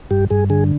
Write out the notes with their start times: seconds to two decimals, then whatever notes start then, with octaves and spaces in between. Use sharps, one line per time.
0.11 G2 G4
0.30 G2 G#4
0.50 D3 G#4